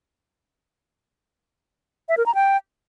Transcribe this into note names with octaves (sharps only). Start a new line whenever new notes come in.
E5
A#4
A#5
G5